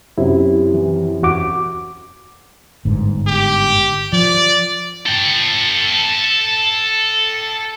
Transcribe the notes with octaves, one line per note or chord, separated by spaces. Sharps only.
F#2 C3 E4
E3
E2 F#4 D6
G1 G#2
G4
F3 D5
A4 G5